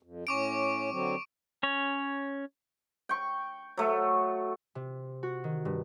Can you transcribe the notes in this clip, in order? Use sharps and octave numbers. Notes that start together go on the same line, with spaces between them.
F2
A2 C#4 C#6 D6 D7
D3 F#3 C4
C#4 C#5
G5 C#6
F#3 A3
C3
F#4
D#3
G2